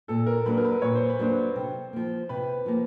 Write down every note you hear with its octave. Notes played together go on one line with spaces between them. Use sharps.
A#2 A4
A#4
F#3 A#3 D4 B4
A#4
B4
A#2 C#5
C5
B4
F#3 A#3 D4 C5
C3
F3 A#3
C3 B4
F3 A#3